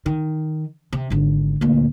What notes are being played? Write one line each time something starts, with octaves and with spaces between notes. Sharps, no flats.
D#3
C3
G#1 D3
D2 A#2